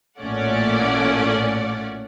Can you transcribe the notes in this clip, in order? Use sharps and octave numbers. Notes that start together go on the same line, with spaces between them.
A1 A#2 A3 C#4 D5 F#5